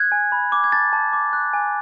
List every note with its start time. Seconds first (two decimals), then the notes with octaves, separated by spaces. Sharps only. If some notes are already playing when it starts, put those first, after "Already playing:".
Already playing: F#6 G#6
0.12 G#5
0.32 B5
0.52 D6
0.64 G#6
0.72 A5 A6
0.93 A5
1.13 D6
1.33 F#6
1.53 G#5